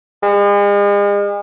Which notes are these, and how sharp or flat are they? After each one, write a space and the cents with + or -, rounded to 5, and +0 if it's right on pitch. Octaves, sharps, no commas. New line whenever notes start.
G#3 -40